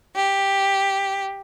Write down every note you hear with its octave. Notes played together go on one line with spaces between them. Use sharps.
G4